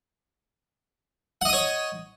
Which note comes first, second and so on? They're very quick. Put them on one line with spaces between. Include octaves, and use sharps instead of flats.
F#5 D#5 D#6 C#5